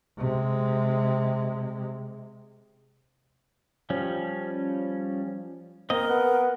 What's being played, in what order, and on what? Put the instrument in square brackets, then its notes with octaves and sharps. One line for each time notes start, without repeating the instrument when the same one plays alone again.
[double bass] C3 G#3
[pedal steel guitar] F3 G3 C#4
[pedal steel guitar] A#3 C4 D#5 [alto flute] A#4
[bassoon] B3 [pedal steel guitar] F#6